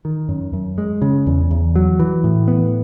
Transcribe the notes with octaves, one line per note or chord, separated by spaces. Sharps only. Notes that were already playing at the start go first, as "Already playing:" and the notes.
D#3
F#2
F#2
G#3
C#3
E2
E2
F#3
E3
A2
B3